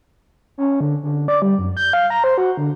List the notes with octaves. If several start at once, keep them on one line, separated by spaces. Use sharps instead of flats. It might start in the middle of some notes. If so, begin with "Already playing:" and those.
C#4
D3
D3
D5
G3
F#2
G6
F5
A#5
C5
F#4
D3